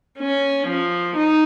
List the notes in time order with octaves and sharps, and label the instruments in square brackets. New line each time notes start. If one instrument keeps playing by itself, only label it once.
[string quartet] C#4
F3
D#4